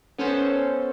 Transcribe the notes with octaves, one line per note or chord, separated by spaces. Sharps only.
B3 C#4 A4 C5